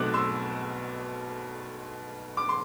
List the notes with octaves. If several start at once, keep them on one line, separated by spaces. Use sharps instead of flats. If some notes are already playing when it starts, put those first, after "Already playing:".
Already playing: B1 B2 A3 C4 D6 F#6
C6 E6
D6
C6